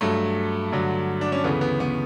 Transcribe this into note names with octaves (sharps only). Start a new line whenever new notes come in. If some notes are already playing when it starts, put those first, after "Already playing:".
G2 F#3 A3
G2 D3 F#3
D4
C#4
D2 C#3 E3 B3
B3
B3